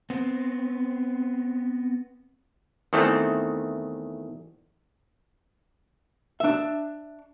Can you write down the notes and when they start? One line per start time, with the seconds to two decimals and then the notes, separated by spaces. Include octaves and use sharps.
0.10 B3 C4
2.93 E2 D#3 E3 A3 C4
6.40 D4 E5